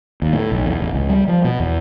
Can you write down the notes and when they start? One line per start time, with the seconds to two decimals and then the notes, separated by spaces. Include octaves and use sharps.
0.22 D#2
0.33 A2
0.52 B1
0.66 E2
0.80 A1
0.94 C#2
1.09 G3
1.28 F3
1.44 B2
1.60 E2